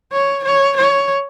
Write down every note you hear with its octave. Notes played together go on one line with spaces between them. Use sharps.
C#5
C#5
C#5